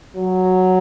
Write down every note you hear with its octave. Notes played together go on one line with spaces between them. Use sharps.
F#3